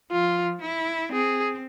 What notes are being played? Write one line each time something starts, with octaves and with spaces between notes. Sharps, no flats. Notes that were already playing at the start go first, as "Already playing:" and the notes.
F3 F4
E4
C4 G#4